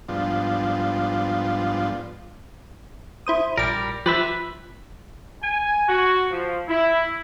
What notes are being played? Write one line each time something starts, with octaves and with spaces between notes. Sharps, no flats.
G#2 F3 G3 B3 D4 F4
E4 C5 D#6
A#1 G3 A#4 D6
F3 G4 B4 E5 F#6
G#5
F#4
F3
E4